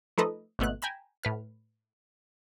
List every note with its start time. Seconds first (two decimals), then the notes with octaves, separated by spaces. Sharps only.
0.18 F3 A3 D#4 A4 B4 D#5
0.59 G#1 B2 A3 B3 F#6
0.82 G5 G#5 A#5 B5 E7
1.23 A2 B4 F6